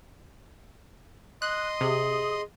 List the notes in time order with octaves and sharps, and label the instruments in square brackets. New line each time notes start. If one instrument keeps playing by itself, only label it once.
[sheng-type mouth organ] D#5 C6 D#6 [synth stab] F#6
[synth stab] C3 [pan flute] G#4